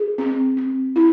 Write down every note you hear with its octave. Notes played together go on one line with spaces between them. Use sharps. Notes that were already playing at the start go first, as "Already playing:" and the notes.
Already playing: G#4
C4
C4
E4